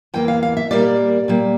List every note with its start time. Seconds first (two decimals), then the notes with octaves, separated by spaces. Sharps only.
0.14 E2 E3 A#3 G5
0.28 F5
0.43 F5
0.57 E5
0.71 A#2 G3 A#3 D5
1.28 A#2 G3 A#3